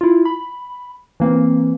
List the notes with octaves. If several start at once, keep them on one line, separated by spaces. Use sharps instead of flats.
E4 F4
B5
E3 A#3 C4